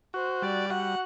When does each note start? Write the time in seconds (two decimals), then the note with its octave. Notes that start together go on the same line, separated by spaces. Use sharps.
0.14 F#4 C5
0.42 G3 D5
0.70 F#4 F#5